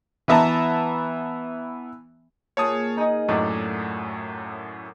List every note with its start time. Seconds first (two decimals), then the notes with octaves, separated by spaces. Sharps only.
0.28 E3 B3 E5 A5 A#5
2.57 A#2 G#4 C#5 A5 D#6
2.97 D#4 G#4 D#5
3.28 F#2 A2 F#3 A3 D5